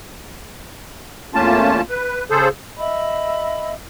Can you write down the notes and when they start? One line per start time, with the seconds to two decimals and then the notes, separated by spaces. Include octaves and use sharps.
1.34 E2 A3 A#3 C#4 F4 A5
1.89 B4
2.30 C#3 G#4 A4 C5
2.77 D#5 E5 B5 E6